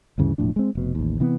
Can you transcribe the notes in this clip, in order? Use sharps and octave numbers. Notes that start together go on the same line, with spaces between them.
D2 G2 C#3 E3
E1 A2 F3 D4
G#3 C4
F1 B2
A1 D#2
C3 E3 B3